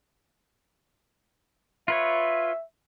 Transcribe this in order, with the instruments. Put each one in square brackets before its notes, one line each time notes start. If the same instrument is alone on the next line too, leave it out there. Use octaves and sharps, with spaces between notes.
[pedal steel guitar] F4 B4 C#5 [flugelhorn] E5